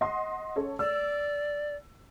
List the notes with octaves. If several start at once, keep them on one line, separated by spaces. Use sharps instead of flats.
D#5 F#5 C6
C#4 A4 C#5
D5 E6